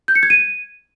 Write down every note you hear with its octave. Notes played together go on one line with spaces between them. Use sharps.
G6
C#7
G#6
D#7